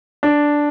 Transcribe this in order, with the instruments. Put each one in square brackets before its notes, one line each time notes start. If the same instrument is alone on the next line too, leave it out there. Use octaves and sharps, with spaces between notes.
[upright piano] D4